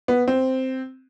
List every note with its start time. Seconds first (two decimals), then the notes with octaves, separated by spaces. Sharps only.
0.08 B3
0.28 C4